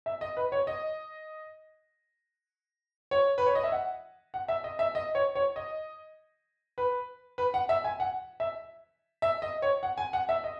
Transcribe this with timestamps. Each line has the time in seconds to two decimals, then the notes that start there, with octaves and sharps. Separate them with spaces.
0.06 E5
0.21 D#5
0.37 B4
0.52 C#5
0.67 D#5
3.11 C#5
3.38 B4
3.46 C#5
3.55 D#5
3.64 E5
3.72 F#5
4.34 F#5
4.48 E5
4.64 D#5
4.79 E5
4.95 D#5
5.15 C#5
5.35 C#5
5.56 D#5
6.78 B4
7.38 B4
7.54 F#5
7.69 E5
7.84 G#5
8.00 F#5
8.40 E5
9.22 E5
9.42 D#5
9.62 C#5
9.83 F#5
9.98 G#5
10.13 F#5
10.29 E5
10.44 D#5